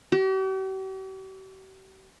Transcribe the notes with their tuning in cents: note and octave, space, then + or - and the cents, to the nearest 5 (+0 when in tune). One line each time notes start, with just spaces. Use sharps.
G4 -45